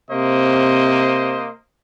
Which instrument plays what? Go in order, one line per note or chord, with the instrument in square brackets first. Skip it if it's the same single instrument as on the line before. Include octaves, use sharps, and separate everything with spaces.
[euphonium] C3 [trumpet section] A#3 C5 D#5